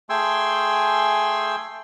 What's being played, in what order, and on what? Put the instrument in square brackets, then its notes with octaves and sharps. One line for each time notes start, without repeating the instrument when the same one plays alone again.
[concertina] A3 G#4 G5 G#5 C6 E6